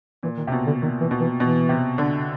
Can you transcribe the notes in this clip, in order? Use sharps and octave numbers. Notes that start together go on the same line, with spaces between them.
A#2 E3
D#3
C3
B2
D3
A#2 D#3
E3
B2
E3
B2 E3
C3
D3